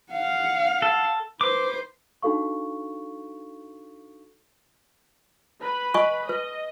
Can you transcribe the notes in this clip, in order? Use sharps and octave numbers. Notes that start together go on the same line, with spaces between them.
F5 F#5
A4
B4 C5 D6
D4 D#4 F#4 A4 F5 C#6
B4 B5
D#5 G#5 C#6
B4 D#5